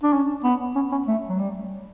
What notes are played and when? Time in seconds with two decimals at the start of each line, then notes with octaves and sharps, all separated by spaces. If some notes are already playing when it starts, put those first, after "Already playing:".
0.03 D4
0.13 C#4
0.44 B3
0.75 C#4
0.92 C#4
1.08 A3
1.29 F#3
1.39 G3